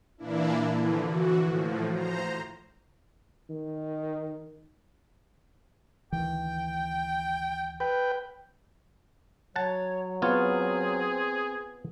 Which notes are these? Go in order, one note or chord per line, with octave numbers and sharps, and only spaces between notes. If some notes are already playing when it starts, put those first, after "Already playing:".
A#2 E3 A#3 D4 E4
D3 E3 F3
E3 F#4
A2 F3
C5 A#5
D#3
D2 D#3 E3 G5
B4 G5
F#3 C#5 F#5 A5
B3 C4 F4 G#4 C#5